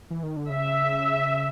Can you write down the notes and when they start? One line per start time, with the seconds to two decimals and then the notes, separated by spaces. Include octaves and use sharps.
0.10 E3
0.23 D#3
0.37 D3
0.50 C#3 E5